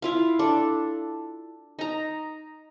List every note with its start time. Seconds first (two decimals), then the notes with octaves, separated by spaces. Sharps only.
0.02 E4 F4 F5
0.39 D4 A4
1.79 D#4 A#5